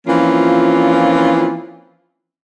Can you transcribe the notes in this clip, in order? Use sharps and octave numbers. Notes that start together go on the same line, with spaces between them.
E3 F3 A#3 C4 C#4 F4